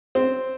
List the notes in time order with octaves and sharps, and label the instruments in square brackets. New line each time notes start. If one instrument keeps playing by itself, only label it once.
[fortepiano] C4